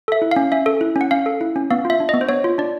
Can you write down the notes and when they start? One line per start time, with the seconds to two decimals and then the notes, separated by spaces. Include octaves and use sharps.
0.08 A4 E5
0.22 E4
0.31 C#4 F5
0.52 C#4 E5
0.66 A4
0.81 E4
0.96 C#4
1.01 F#5
1.11 C#4 F5
1.26 A4
1.41 E4
1.56 C#4
1.71 B3 F5
1.85 F4
1.90 E5
2.00 D4
2.09 B3 D#5
2.21 C5
2.29 B3 C#5
2.44 F4
2.58 D4 D5